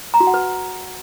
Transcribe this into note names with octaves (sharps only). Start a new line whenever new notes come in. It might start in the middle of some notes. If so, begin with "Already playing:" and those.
A#5
F#4
F#5
B4